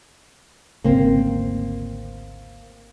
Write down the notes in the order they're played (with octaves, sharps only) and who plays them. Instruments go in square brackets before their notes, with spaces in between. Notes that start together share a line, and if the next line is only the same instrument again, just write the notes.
[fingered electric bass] G#1 D2 C#3 [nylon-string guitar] A#3 C4